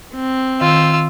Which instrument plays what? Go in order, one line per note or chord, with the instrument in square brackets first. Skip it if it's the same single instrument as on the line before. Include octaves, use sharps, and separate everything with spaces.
[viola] C4
[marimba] D#3 [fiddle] F4 E6